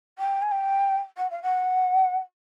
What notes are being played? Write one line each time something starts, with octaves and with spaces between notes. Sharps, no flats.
G5
G#5
G5
F#5
F5
F#5